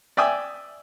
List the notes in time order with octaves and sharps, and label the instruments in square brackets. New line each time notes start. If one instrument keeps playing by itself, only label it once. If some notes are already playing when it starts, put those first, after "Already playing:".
[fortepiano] D5 E5 G5 G#5 D#6 E6